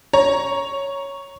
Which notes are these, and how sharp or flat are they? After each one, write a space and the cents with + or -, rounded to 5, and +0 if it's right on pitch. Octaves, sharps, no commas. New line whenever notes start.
C#5 +0 A#5 +5